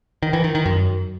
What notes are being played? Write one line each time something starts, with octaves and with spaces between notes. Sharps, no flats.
D#3
E3
D#3
D#3
F#2